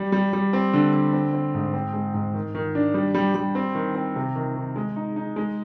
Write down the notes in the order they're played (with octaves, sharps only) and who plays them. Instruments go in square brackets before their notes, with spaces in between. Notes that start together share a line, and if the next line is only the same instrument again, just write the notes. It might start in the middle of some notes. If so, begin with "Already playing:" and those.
Already playing: [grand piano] G3
G3
G3
C4
D3
D3
C4
C4
G#2
C4
G#3
G#2
D#3
D#3
D4
G3
G3
G3
C4
D#3
C4
C3
D#3
D#3
G#3
D#4
D#4
G#3